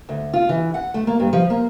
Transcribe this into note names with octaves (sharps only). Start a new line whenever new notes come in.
D2
F4
E3
F#5
A3
A#3
G2
F3
A#3